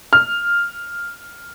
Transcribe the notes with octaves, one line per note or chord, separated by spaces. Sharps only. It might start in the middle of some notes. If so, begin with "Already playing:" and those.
F6